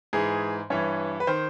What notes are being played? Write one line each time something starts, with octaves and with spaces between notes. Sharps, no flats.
G#2 E3 G#4
G2 E3 C#5
B4
D#3 C5